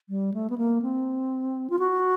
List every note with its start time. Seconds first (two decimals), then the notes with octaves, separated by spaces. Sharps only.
0.09 G3
0.34 A3
0.50 B3
0.58 A#3
0.82 C4
1.70 F4
1.79 F#4